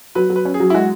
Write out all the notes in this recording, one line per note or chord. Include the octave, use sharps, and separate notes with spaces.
F#3 B4
F#3
B4
C#4
G#4
F#3
E4
G#3 F#4